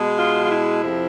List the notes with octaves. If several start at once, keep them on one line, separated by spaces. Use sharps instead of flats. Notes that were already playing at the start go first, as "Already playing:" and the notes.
Already playing: B2 G#3
F4
F4
E4
F2 C3 F3